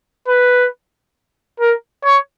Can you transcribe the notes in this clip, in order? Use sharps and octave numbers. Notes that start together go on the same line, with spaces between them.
B4
A#4
C#5